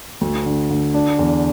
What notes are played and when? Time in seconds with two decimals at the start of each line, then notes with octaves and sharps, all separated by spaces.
0.21 D2
0.46 D3
0.70 D3
0.94 D4
1.19 E2